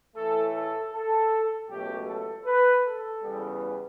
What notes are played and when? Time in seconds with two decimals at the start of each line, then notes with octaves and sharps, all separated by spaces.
0.15 A2 E3 A3 A4
0.54 A4
0.93 A4
1.69 C#2 B2 F#3 A3 G4
2.07 A4
2.45 B4
2.84 A4
3.22 E2 C#3 G3 B3